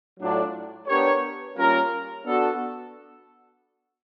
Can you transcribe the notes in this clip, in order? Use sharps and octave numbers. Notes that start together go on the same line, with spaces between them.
A2 F#3 A3 D4 F4
B3 D4 G4 A#4 C#5
G3 A#3 C#4 F4 A#4
B3 D4 F#4 A4